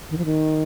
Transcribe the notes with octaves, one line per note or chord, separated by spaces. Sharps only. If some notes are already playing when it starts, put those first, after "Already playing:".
D#3
F3
D#3